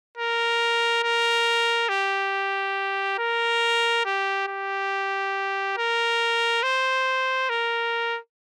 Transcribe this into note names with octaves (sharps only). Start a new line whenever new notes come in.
A#4
A#4
G4
A#4
G4
G4
A#4
C5
A#4